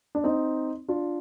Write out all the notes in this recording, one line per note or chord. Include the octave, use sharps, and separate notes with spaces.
D4
C4 D#4
D4 F4